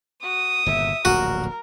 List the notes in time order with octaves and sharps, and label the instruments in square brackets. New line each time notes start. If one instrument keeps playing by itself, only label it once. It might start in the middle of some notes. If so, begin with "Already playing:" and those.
[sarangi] F#4 [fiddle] D#6
[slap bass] G1 A#2 C#3 [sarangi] E5
[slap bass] D1 A#1 G2 [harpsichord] F#4 [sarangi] A#4